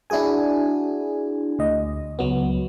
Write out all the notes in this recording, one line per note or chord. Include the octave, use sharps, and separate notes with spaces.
D4 E4 F#4 G#4 G#5
D2 D#5
C#2 F#3 B3